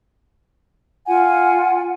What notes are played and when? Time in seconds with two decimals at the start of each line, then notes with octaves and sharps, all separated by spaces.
1.07 F4 F#5 G#5